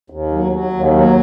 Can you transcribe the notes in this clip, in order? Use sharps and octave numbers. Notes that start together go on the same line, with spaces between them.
D#2
F#3
F#3
D#2
F#3